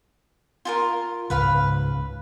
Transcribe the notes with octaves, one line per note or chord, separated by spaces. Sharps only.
F4 G4 A#4
C#2 G#2 B4 F5 B5